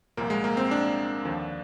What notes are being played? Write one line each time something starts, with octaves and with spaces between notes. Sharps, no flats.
C2 A#2 F3 A#3
G#3
A#3
C4
D4
D#2 D3 F3